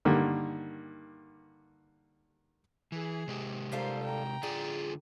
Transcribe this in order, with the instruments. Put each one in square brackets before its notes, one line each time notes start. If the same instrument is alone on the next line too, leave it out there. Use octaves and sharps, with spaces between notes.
[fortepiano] G2 D3 D#3 A#3
[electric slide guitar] E3 [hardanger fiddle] G#4
[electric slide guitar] C3 G#3 G4
[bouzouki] G3 F4 A4 [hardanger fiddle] A#4 C5
[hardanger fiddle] G5 A#5
[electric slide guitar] D3 F4 D5 [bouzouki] G#4